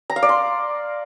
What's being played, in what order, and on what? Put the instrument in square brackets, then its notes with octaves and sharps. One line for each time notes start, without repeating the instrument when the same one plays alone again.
[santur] A#5
F5
D5
C6